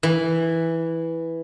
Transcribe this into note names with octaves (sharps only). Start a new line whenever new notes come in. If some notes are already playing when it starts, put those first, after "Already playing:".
E3